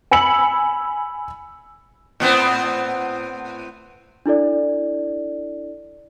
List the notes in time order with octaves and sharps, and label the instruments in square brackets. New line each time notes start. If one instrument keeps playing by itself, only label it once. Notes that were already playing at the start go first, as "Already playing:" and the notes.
[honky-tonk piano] G#5 B5 E6 C#7 F#7
[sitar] A2 B3 C4
[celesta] D4 E4 A4 D5